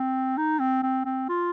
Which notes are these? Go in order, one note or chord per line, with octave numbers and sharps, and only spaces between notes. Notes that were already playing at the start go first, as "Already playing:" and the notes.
Already playing: C4
D#4
C4
C4
C4
F4